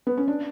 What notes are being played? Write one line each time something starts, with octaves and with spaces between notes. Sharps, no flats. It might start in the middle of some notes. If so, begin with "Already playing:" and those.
B3
C#4
D4